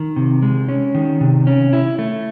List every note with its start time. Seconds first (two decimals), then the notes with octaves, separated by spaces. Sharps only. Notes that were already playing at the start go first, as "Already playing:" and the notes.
Already playing: D#3
0.16 C3
0.42 G#3
0.69 C#4
0.95 D#3
1.21 C3
1.47 C#4
1.73 E4
1.99 A3